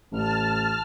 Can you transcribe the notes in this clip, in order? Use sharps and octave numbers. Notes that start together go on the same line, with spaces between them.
A1 A5 F6